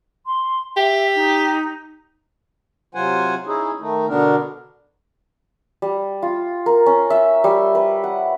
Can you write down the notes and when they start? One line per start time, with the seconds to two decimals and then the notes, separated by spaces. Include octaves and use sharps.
0.26 C6
0.77 G4 E5
1.15 D#4
2.95 C3 F#3 F4 C5 F#5 G#5
3.47 C#4 D#4 E4 G#4
3.80 D#3 A3 D#4
4.08 B2 D3 B3 D4 A#4
5.82 G3
6.23 F4
6.66 A#4
6.86 C#4
7.10 E5
7.44 G3
7.75 B4
8.04 F#5